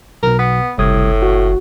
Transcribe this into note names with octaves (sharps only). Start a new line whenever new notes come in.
B1 B2 A#4
B3
F#1 C2 A2 D#6 G#6
F#4